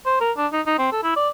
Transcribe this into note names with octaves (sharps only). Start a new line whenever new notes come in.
C5
A#4
D4
D#4
D#4
C4
A4
E4
D5